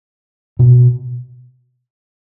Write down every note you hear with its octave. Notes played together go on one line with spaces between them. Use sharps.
B2